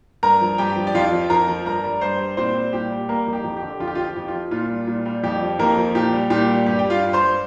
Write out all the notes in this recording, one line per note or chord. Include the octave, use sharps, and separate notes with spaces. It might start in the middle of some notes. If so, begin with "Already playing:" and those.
G2 A#4 A#5
F3
G2 G4 G5
F3
D5
F2 F4 F5
F3
F2 A#4 A#5
F3
G2 A#4 A#5
G3
G2 C5 C6
G3
A#2 C4 C5
G3
A#2 G4
G3
G3 A#3 A#4
F2
G4
F2
G4
D3
F2 F4
G4
F3 F4
G4
F2
F4
F3
A#2 F4
G3
A#2
G3
F2 G4
F3
F2 A#3 A#4
F3
A#2 G4
G3
A#2 G4
G3
G2 G4
G3 G5
F4 F5
G2
C5 C6
G3